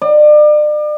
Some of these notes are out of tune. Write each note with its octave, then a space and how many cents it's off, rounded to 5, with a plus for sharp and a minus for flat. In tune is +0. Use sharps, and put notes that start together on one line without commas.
D5 +35